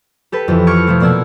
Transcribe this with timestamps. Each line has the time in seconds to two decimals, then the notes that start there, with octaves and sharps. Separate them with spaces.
0.32 G4 A4 B4
0.48 F2 E3
0.67 C#6 D6 F6 G6 G#6 C#7
0.87 C3 F3 A3
1.00 B2 A#3 D5 F#5 E6 G#6